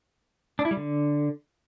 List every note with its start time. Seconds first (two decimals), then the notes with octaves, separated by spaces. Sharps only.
0.59 D4
0.65 E4
0.71 G3
0.77 D3